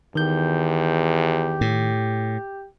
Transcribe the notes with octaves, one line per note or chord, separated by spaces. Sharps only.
E2 D#3 G4 G6
A2